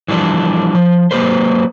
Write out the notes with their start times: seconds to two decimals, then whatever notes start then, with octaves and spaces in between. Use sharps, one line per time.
0.08 E3 F3 G3 D4
0.75 F3
1.11 F#3 A#3 C#4 G4 B4 C5